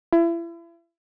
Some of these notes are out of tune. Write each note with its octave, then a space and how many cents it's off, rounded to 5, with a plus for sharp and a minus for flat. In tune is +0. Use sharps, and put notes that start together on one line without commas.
E4 +35